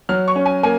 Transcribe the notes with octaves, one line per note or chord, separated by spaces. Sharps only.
F#3 F6
C#6
C#4
G#5
A#3 G#5